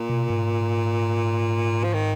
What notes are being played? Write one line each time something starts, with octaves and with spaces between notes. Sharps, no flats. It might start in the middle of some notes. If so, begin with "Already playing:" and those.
Already playing: A#2
B2
G#2
F3
D#3